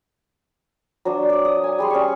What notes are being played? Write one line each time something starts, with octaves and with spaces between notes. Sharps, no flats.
F#3 D4 D#6
D5 D6
D#6
G#5
G3 G#4 C6
C#4 C#6